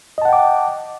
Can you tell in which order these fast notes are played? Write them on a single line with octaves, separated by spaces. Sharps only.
D#5 A5 F#5 G5 D6